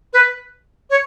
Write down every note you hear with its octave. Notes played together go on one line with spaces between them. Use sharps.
B4
C#5